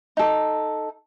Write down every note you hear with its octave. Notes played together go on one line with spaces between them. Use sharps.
D#4 A4